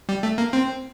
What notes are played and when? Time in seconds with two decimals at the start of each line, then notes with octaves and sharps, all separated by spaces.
0.09 G3
0.23 A3
0.38 A#3
0.53 C4